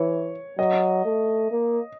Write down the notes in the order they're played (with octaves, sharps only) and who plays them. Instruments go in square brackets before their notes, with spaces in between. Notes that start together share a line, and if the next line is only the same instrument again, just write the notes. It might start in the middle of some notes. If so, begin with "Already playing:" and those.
Already playing: [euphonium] E3 [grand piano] C#5
[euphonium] F#3 [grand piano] D#5
[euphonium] A3
A#3